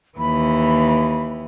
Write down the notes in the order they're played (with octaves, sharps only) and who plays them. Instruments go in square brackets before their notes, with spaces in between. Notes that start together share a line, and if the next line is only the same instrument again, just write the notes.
[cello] D#2 E3 [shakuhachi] B5